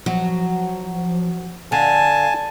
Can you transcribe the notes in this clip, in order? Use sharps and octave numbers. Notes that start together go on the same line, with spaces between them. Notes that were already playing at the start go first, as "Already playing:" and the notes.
F3 F#3
D3 F5 G#5 A5